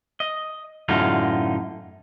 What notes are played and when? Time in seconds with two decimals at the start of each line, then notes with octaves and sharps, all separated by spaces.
0.20 D#5
0.89 F#2 A2 D3 D#4 F4